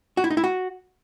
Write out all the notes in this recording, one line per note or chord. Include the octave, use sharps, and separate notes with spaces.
F#4
E4
D#4
E4
F#4